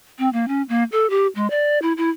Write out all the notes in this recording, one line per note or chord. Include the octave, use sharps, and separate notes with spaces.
C4
A#3
C#4
A#3
A4
G4
G#3
D5
E4
E4